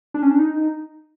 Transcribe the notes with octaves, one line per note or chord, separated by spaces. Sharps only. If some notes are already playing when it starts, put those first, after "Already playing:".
D4
C#4
D4
D#4